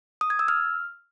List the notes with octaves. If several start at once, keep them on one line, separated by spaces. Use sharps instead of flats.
D#6
G#6
E6
F6